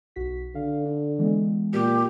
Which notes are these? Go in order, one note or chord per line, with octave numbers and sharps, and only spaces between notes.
B1 F#4 B6
D3 F5
D4
E3 G#3 B3
A#2 G4